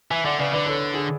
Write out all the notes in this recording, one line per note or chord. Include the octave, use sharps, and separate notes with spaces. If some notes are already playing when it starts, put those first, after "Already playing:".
E3 E5 G#5
D3 D5 F#5
C#3 B4 D5
D3 B4 D5
A4 C#5
G#4